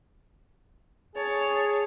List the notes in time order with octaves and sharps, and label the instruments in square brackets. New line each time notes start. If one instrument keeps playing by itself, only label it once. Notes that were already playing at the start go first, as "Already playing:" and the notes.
[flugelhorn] G#4 [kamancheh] C#5 A5